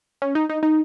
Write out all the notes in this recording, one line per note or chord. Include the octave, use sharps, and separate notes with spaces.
C#4
D#4
D#4
D#4